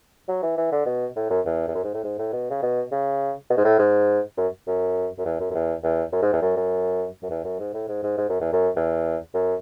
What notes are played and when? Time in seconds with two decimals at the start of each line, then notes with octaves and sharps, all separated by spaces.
0.28 F#3
0.43 E3
0.57 E3
0.72 D3
0.86 B2
1.16 A2
1.30 F#2
1.45 E2
1.68 E2
1.75 F#2
1.84 G#2
1.94 A2
2.04 G#2
2.18 A2
2.33 B2
2.50 C#3
2.62 B2
2.92 C#3
3.50 B2
3.57 G#2
3.65 A2
3.79 G#2
4.37 F#2
4.67 F#2
5.18 F#2
5.25 E2
5.40 F#2
5.50 F#2
5.54 E2
5.83 E2
6.12 F#2
6.22 G#2
6.33 E2
6.42 F#2
6.57 F#2
7.22 F#2
7.30 E2
7.45 F#2
7.59 G#2
7.74 A2
7.89 G#2
8.03 G#2
8.18 G#2
8.29 F#2
8.41 E2
8.52 F#2
8.76 E2
9.34 F#2